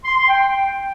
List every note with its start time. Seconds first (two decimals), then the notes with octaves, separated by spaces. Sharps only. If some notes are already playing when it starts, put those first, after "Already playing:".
0.05 C6
0.16 C6
0.28 G5